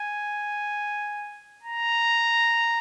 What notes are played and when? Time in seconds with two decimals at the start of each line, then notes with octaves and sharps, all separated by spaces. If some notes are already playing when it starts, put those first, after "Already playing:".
Already playing: G#5
1.64 A#5